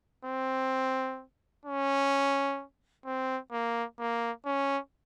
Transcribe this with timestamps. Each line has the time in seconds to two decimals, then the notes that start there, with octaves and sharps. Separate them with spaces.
0.25 C4
1.66 C#4
3.06 C4
3.52 A#3
3.99 A#3
4.46 C#4